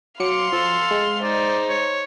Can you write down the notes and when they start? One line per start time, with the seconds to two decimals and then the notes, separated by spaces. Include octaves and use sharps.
0.20 F#3 F5 C6 D6 C#7
0.52 F3 A4
0.91 G#3
1.22 D#4 C5 D5
1.69 C#5